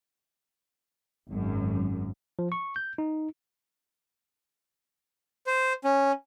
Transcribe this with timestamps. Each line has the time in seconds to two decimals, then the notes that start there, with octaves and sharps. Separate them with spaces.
1.30 G#1 F#2
2.39 F3
2.52 C#6
2.76 G6
2.98 D#4
5.47 C5
5.84 C#4